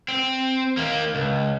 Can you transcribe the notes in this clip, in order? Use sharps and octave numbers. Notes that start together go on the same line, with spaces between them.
C4
D#2 A#3
C#2